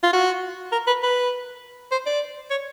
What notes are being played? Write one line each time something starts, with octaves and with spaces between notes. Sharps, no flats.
F4
F#4
A#4
B4
B4
C5
D5
C#5